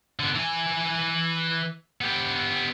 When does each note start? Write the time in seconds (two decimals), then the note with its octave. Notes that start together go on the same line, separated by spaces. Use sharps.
0.19 D3 B3
0.35 E3 G#5
2.01 B3 G4